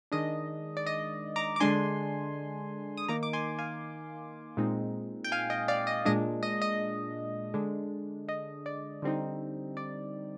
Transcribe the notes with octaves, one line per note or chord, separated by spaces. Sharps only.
D#3 G#3 D4 D#5
D5
D#5
A#5 D6
D6
D3 G#3 D4 G#5 C6
D#6
D#3 A#3 D#4 A#5 D6
D6
G#5 C6
F5 G#5
A#2 G#3 C4 D#4
G5
F5 G#5
D#5 G5
D5 F5
D#5
A#2 G#3 D4 D#5
D#5
D#5
D3 G#3 D4
D#5
D5
D3 G3 C4 D#4
D5